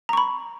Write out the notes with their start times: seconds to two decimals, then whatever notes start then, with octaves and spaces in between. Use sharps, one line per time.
0.09 A#5
0.13 C#6
0.17 B5